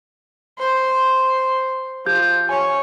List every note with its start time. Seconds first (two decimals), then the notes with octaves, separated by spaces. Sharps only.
0.59 C5
2.06 F3 G4 G6
2.49 C#5 G#5